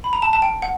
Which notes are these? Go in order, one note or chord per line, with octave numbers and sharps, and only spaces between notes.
B5
A#5
A5
A5
G5
F#5